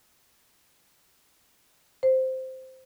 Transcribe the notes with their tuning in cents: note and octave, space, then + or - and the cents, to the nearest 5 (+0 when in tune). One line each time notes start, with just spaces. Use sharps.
C5 -5